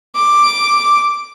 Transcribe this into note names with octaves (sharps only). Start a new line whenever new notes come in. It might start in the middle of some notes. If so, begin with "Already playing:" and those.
D6